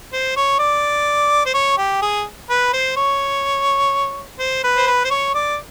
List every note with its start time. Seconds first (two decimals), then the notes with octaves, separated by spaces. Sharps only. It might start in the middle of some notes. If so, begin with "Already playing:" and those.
0.13 C5
0.36 C#5
0.59 D5
1.46 C5
1.54 C#5
1.78 G4
2.02 G#4
2.50 B4
2.73 C5
2.97 C#5
4.40 C5
4.64 B4
4.77 C5
4.87 B4
5.05 C5
5.10 C#5
5.35 D5